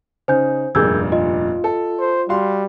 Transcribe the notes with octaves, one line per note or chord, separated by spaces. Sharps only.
C#3 D#4 C5 G#5 G6
F1 G2 A#2 G#4 A#4 E6 G6 G#6
F4 D#5
A4
C5
G3 F#4 F5 C6